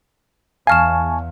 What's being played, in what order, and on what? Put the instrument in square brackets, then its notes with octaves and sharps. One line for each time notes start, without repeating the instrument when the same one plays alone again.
[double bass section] E2 [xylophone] F5 F6 E7 [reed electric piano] G#5 A5 C#6